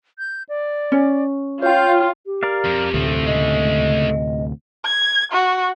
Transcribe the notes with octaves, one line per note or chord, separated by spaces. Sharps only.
G6
D5
C#4
F4 C#5 G5 G6
G4
A#4 D5 F5
F2
D2 A2 C3 F3 A3 C4
C#3 G#3 D#5
G#6
F#4